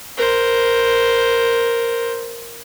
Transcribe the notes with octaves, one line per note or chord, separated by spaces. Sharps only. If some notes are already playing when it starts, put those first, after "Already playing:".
A#4 C5